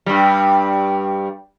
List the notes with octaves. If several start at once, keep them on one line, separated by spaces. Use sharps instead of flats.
G2 G3